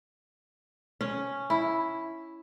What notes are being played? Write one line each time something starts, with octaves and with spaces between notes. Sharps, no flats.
C#4
E4